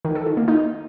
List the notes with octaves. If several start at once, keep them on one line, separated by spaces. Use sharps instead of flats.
D#3
A4
D#3
A#3
D#4